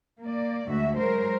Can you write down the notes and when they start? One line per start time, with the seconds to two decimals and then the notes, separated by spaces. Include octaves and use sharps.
0.22 A#3 D5
0.68 D2 G#3 F#4 E5
0.98 F#3 G#3 A#4 C5